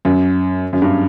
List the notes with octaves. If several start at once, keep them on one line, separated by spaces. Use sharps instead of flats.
F#2
F#2
G2